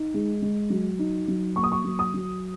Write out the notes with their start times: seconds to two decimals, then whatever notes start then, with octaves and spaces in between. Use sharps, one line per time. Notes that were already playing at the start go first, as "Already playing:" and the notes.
Already playing: D#4
0.14 G#3
0.42 G#3
0.70 F#3
0.99 D#4
1.28 F#3
1.56 A#3 C#6
1.63 D#6
1.72 C#6
1.84 F#3
1.99 D#6
2.14 F#3